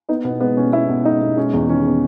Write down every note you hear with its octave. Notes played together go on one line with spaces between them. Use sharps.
B3 D#4
B2 B3
G#3 B3
B2 C#4
B3 E4
B2
G#3 D#4
B2
G#3 C#4
E2
D#3 C#4
B3